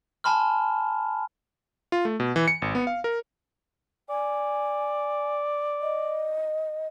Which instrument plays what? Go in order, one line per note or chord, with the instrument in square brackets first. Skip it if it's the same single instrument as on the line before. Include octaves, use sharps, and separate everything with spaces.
[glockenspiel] G#5 A5 B5 C6 F6
[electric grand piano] F4
A3
B2
E3
C#7
G#1
B3
F5
A#4
[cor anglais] D5 [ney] G#5
[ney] D#5